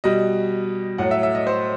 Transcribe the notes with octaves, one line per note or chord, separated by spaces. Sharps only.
B2 G3 D#5
A2 F#3 F#5
E5
E5
D#5
C5